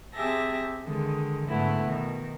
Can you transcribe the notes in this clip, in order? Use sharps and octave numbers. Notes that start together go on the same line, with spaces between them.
C4 G4 G#4 E5 A5 A#6
D3 D#3 G#3
G#2 D3 A3 B3 E4
B2 D#3